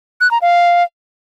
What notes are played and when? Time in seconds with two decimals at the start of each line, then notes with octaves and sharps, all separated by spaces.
0.21 F#6
0.31 A#5
0.42 F5